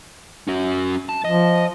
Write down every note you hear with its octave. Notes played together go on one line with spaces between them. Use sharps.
C#4 F#4
A5
F3 D#5